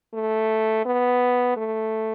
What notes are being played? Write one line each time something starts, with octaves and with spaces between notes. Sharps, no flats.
A3
B3
A3